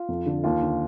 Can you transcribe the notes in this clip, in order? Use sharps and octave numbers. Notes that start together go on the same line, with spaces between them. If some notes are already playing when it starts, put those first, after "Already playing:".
Already playing: F4
F2
D3
D#2 F4
D3